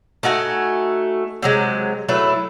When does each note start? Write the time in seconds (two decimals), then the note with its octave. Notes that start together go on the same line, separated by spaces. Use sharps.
0.23 A3 D#4 F#4 G#5
1.43 C3 F#3 G#3
2.09 F#3 A3 E4 B4